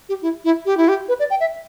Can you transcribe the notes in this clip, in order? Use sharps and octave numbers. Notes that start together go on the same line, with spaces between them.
G4
E4
E4
G4
E4
G4
B4
D5
G5
E5